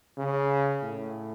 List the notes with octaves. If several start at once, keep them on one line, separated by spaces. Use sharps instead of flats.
C#3
A2